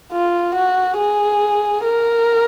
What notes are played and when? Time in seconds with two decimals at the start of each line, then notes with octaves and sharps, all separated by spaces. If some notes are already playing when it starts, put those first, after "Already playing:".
0.13 F4
0.55 F#4
0.99 G#4
1.85 A#4